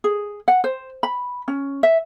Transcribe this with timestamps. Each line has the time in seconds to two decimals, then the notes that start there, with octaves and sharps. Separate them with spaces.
0.04 G#4
0.48 F#5
0.64 C5
1.03 B5
1.48 C#4
1.83 E5